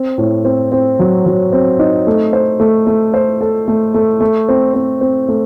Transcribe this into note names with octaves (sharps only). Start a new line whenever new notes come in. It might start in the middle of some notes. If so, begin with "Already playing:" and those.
Already playing: C4
A2
C4
C4
F#3
F#3
C4
D#4
A3
C5
A3
A3
C5
A4
A3
A3
A3
C4
C4
C4
A3